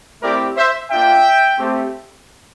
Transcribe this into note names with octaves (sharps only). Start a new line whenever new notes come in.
A3 C4 E4 G4 A#4 D5
C5 E5
A#3 D4 F4 E5 G5
A3 C4 G4